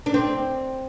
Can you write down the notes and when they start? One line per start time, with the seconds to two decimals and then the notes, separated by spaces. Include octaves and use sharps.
0.06 D4
0.14 C4